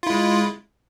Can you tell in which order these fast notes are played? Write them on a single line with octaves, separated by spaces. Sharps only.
F4 E4 G#3